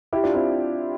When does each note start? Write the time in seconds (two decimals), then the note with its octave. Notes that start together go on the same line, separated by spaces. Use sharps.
0.13 E4 G4
0.24 D4 F4
0.34 C4 E4